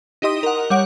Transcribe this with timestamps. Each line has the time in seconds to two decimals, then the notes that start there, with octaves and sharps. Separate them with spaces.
0.22 D#4 E4 G4 D#5 C6 D#6
0.43 A#4 F#5
0.70 G3 C#5 F#5 D7